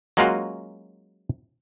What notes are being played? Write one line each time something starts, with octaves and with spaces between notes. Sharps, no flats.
F#3 G#3 A#3 C#4 F4 F#4